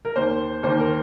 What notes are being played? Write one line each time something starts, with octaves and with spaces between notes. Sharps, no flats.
A#4
D#2 D#3 C5
D#2 D#3 C5
A#4